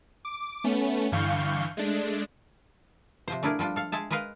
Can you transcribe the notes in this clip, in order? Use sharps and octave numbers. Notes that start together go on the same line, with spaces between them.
D6
A3 B3 C#4
G2 D3 E3 F5 C#6 G6
G#3 A3 D4
C3 F3 C5
A3 D4 E4 G#4 A#4
F3 G3 D4 F4
A4 F5
G#3 G#4 E5 A5
G#3 A#4 B4 D#5 F5